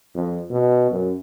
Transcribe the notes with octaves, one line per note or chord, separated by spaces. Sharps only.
F2
B2
F#2